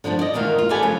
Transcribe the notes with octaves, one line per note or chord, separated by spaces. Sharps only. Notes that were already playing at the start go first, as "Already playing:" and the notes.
D3 F3 B3 D4
D5 D#5
E2 B2 D#3 A#3 F4
F4
G4 A4 B4 D5 F#5 G#5
F2 C#3 F#3